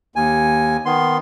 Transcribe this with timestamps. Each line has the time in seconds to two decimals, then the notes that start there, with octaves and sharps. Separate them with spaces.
0.16 D#2 G#5
0.86 D#3 B3 C6